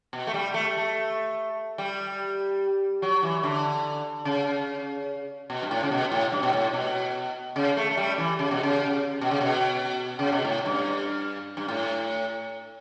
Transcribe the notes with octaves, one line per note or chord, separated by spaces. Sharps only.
B2
A3
G3
A3
A3
G3
F#3
E3
D3
C#3
B2
G2
A2
C#3
B2
A2
G2
B2
A2
B2
C#3
A3
A3
G3
E3
C#3
B2
C#3
B2
C#3
B2
C#3
B2
A2
G2
G2
A2